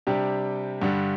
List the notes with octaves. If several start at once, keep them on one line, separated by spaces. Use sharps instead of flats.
C3 G3 D4 G4
G2 D3 G3